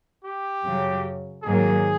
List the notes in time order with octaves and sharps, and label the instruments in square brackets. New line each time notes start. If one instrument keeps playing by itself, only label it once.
[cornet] G4
[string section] F#2 C#3 F#3
[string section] G#2 D#3 F#3 A#3 [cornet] G#4